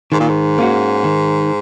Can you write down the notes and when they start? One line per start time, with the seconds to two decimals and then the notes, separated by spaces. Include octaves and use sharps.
0.12 G#2 D#3
0.20 A#2
0.29 G#2
0.58 A#3 C#4 F#4
1.04 D#3